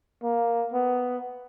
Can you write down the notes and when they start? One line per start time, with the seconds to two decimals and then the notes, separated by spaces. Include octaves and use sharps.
0.23 A#3
0.73 B3